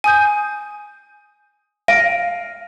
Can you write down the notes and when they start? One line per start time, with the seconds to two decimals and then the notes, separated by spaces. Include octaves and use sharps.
0.04 G#5 D#6 G6
1.88 F5 A#6 D7 D#7